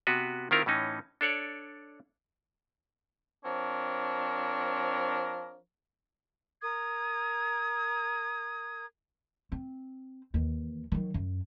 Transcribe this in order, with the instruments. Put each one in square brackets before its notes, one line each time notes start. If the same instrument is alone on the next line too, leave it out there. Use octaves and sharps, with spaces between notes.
[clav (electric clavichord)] C3 B3 F#4 B4
D#3 C4 E4 F4 A#4
A2 E3 C#4 D#4
D4 A4 C#5 D5
[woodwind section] F3 C4 D4 A#4 C#5
[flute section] A#4 D#6 G#6
[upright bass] C4
D#2 E3
D#3 F#3
F#2